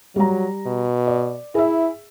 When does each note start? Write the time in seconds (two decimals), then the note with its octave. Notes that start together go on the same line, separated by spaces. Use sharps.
0.16 F#3 G3 A#5
0.66 B2
1.07 D5
1.55 E4 G#4 E5